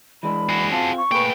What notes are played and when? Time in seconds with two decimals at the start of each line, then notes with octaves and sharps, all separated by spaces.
0.23 E3 G#3 D4 B5
0.49 F#4 G#4
0.71 C4 F4 A5
0.98 C#6
1.12 A3 A#3 G#4 B4 G5